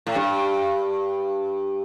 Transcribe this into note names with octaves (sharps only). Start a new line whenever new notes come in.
A2
G2